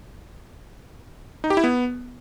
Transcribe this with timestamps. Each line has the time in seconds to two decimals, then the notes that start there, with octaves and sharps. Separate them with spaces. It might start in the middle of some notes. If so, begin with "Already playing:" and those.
1.44 D#4
1.50 G4
1.57 E4
1.64 B3